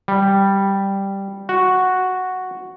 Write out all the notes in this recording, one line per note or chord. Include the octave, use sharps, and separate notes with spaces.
G3
F#4